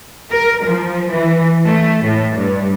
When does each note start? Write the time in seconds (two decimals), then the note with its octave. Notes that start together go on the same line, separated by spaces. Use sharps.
0.31 A#4
0.65 F3
1.11 E3
1.65 A3
2.06 A2
2.37 G2